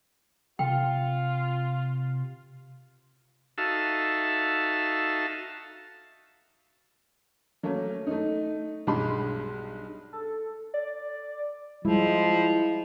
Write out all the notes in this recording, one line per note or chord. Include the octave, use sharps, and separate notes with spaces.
C3 F4 G5
D#4 F#4 A4 E5 F5 A5
F#3 A3 A#3 C#4
A3 D#4
B1 G2 G#3 B5 C6
A4
D5
F3 G3 G#3 E4